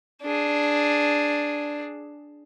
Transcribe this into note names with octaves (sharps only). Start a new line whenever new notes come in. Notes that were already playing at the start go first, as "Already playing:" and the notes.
D4 G#4